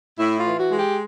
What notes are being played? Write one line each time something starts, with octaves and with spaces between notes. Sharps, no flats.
A2 E4
F4
E3
F#4
G#3
G4